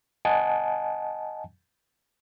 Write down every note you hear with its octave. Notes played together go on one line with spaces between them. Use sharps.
D#5 F#5 G#5 A5